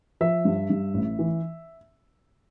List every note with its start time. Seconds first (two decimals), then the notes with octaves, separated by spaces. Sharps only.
0.21 F3 E5
0.45 G2
0.70 G2
0.94 A1
1.19 E3